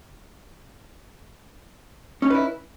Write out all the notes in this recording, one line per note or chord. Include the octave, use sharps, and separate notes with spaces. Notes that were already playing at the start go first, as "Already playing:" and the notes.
C#4 D#4 E4 B4